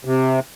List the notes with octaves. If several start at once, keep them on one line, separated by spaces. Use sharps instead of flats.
C3